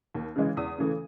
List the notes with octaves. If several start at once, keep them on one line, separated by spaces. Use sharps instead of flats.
D#2
C#3 E3 G#3
E2 D#6
C#3 E3 A3